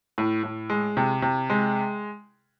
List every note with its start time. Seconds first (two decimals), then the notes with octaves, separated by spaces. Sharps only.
0.18 A2
0.43 A2
0.70 G#3
0.97 C3
1.22 C3
1.50 G#3